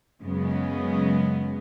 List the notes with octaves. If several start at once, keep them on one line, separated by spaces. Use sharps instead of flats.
F#2 C#3 G#3 B3